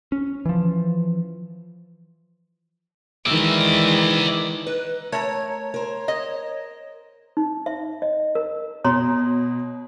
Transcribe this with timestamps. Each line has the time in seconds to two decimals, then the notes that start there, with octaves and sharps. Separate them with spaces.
0.12 C#4
0.45 E3 F3
3.26 D#3 E3 G#3 D5 E5
4.67 D#4 B4
5.12 A3 A#4 C#5 A#5
5.74 A#4 C5
6.08 D#5
7.37 D#4
7.66 E5
8.02 D#5
8.35 A#4
8.84 B2 C#5 A#5 C6